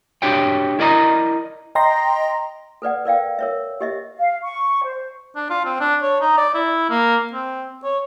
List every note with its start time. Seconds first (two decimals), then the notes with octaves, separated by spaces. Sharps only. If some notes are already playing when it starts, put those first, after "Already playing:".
0.22 D4 F#4 G4 C#5 G5
0.79 E4 A#4 D5 D#5 F#5 A#5
1.75 D#5 G5 A#5 C6 A#6
2.82 A4 B4 D5 F#5
3.05 A#4 D5 F5 G5
3.39 A#4 C#5 E5
3.81 G4 D#5 E5
4.17 F5
4.43 C#6
4.84 C5
5.36 D4
5.50 F4
5.65 C4
5.80 D4
6.02 C#5
6.21 D#4
6.37 D5
6.54 E4
6.90 A#3
7.33 C4
7.84 C#5